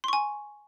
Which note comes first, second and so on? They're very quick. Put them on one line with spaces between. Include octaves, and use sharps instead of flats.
C6 C#6 G#5